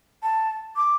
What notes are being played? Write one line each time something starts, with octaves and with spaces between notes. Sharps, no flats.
A5
D6